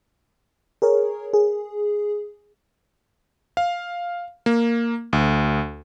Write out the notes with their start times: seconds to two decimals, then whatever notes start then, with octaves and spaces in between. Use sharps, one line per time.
0.82 G#4 A#4 C#5
1.33 G#4
3.57 F5
4.46 A#3
5.13 D2